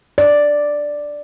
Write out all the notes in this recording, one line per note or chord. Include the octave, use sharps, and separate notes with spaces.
D5